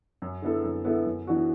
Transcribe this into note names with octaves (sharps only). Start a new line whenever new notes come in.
F#2
D3 B3 E4 A4
F#2
D3 B3 E4 A4
F#2
E3 B3 D4 F#4